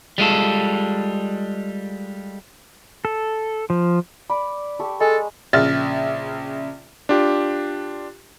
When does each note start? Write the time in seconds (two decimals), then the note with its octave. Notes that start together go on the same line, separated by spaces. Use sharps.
0.18 G3 G#3 F4 A4
3.05 A4
3.70 F3
4.30 D5 B5
4.79 G4 A4 C#6
5.00 G#3 A4
5.53 A#1 C#3 E5 F6 A6
7.09 D4 F4 G4